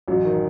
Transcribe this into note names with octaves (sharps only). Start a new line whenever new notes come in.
A1 F#2 F#3
D#3